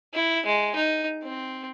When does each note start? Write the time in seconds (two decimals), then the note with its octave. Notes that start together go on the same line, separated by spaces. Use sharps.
0.14 E4
0.46 G#3
0.75 D#4
1.23 C4